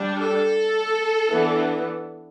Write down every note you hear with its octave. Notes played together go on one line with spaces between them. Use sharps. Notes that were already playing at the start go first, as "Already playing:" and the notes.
Already playing: G3 D4
A4
E3 B3 D4